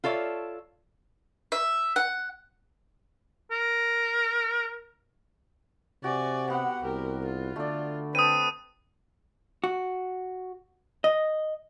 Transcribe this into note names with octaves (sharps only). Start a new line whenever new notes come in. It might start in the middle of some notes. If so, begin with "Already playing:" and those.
F4 A4 C#5 D5 E5
E5
F#5
A#4
C3 F#4 D5 G#5
B3 G4 F#5
C2 G4 A#4
F4
D3 A3 D5
C4 B4 A5 D#6 D#7
F#4
D#5